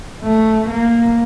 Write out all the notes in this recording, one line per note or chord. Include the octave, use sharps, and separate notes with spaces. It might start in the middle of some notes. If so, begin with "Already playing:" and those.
A3
A#3